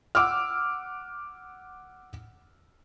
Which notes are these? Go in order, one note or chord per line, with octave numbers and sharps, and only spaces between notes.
F#5 D6 E6 F6